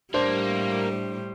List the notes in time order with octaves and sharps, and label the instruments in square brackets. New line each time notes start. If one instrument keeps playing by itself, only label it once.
[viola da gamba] A2 G3 [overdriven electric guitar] A#3 [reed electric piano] D4 [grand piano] C5